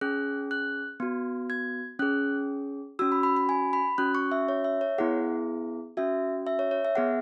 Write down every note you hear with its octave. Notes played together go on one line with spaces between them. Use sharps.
C#4 G#4 F#6
F#6
B3 F#4
G#6
C#4 G#4 F#6
C#4 F#4 E6
B5
B5
B5
G#5
B5
C#4 F#4 F#6
C#6
E5
C#5
E5
C#5
B3 E4 G#4 F#5
C#4 F#4 E5
E5
C#5
C#5
E5
B3 G#4 F#5